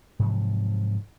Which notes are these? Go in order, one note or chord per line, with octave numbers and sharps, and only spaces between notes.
G#2 C3 F3 F#3